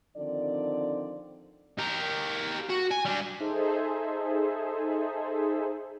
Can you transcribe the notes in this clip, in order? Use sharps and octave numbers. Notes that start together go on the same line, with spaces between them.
D3 D#3 F3 C4 D5
G4 A#4
F#4
G#5
G3 D4
D#4 G#4 A4 C5 E5